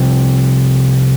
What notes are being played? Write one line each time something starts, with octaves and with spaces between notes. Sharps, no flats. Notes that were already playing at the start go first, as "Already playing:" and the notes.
Already playing: C2 C3 F3 C4